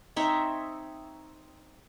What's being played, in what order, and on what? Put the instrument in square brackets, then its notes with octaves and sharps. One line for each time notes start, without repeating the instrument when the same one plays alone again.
[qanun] C4 D#4 C#5 E5